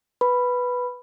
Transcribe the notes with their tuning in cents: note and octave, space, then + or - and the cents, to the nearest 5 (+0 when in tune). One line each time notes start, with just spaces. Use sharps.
B4 +0 B5 +0